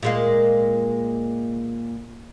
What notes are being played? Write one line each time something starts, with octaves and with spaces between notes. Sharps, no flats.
A#2 G#3 A#3